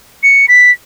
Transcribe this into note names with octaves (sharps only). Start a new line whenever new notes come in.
C#7
B6